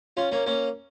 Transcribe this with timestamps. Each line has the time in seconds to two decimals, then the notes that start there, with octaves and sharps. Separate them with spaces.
0.17 C#4 F4
0.32 A#3 C#4
0.46 A#3 C#4